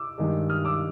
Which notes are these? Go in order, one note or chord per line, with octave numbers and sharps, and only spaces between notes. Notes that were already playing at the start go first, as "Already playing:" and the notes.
Already playing: D6 E6
G2 D#3 G#3
D#6 F6
D6 E6